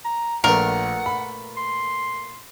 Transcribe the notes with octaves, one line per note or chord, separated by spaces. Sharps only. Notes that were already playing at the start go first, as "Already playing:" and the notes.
A#5
A#1 A#2 A3 A#4 B4 F#5
B5
C6